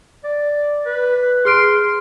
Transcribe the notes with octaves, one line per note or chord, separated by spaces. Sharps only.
D5
B4
G#4 C6 F6 D7